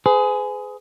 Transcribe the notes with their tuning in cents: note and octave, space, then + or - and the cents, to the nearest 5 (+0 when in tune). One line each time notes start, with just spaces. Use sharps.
G#4 +15 B4 +45